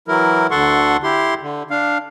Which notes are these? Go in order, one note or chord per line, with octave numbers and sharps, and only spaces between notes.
E3 F#3 E4 A#4
D2 D3 A4 F#5 C6 C#6
E4 G4 C6
D3
D4 F5